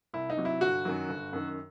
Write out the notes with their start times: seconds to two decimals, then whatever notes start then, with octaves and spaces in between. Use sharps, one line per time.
0.14 C2 E4
0.30 D#4
0.37 C3 F#3
0.45 E4
0.61 G1 F#4
0.85 F#2 D#3 F#3
1.09 G1
1.33 F#2 D#3